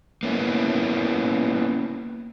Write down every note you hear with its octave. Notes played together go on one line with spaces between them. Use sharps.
A#3 B3 C#4 E4